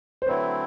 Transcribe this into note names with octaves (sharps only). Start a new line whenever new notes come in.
C5
D3 F#3 A3 C4 E4 B4 C#5